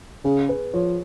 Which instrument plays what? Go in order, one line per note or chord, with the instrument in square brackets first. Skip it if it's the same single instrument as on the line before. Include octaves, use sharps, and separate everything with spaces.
[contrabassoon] C#3 [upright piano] G#4
[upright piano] B4
[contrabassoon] F3 [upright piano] C#5